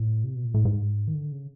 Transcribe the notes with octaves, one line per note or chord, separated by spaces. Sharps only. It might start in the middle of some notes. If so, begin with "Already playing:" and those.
Already playing: A2
C3
B2
A#2
A2
G#2
D#3
D3
C#3